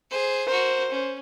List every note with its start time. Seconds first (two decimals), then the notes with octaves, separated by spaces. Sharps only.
0.10 G#4 C5
0.48 F#4 A#4 C5
0.90 C#4